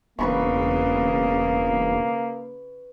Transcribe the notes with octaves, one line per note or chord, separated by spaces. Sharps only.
E1 C#3 A#3 B4 B5 C#6